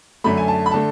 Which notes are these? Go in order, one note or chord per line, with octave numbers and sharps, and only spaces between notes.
F#2 D3 A3 B5
G#5
A5
B5
D3 A3 A5